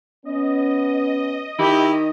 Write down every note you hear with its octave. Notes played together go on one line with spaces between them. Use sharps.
B3 C#4 D#5
D#3 E4 G4